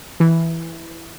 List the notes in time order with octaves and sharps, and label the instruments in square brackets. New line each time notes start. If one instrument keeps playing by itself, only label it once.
[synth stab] E3